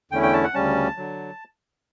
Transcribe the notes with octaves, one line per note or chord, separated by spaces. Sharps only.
E2 D3 A3 C#4 E4 G5
G5
A5
F#5
D2 C#3 G3 C#4 A5
D3 F#3